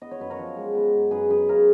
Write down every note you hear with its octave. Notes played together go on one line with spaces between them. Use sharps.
B3 D#5
C#5
F#2 B4
A#4 C#5
F3
G#3
B3
F#2
F#2 G#4 B4
F#2 G#4 B4
C#3 A#4 C#5